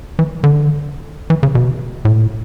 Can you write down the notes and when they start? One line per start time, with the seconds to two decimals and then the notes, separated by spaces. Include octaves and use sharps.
0.19 E3
0.44 D3
1.30 E3
1.43 C#3
1.55 B2
2.05 A2